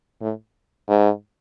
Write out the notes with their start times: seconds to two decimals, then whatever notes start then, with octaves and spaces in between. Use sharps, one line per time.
0.21 A2
0.88 G#2